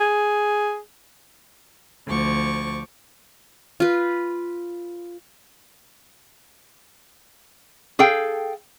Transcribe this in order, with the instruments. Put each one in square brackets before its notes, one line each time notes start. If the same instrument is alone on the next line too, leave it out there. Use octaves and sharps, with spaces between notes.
[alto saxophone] G#4
[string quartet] D2 F3 C#6 D6
[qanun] F4 B4
[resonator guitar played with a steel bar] G#4 A4 F5 G5